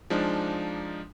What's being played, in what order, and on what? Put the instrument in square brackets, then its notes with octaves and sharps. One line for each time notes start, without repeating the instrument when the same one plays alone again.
[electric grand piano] F3 G#3 D4 D#4